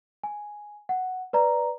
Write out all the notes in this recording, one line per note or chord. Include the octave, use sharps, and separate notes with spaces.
G#5
F#5
B4 D5 A#5